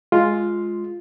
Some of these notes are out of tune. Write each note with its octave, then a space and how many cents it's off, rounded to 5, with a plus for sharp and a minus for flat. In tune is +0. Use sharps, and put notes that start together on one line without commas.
G#3 +10 F4 +0